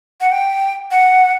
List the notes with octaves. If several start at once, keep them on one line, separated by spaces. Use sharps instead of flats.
F#5
G5
F#5